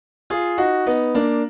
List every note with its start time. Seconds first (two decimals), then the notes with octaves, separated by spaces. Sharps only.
0.30 F4 G#4
0.58 D#4 F#4
0.86 B3 D#4
1.15 A#3 D4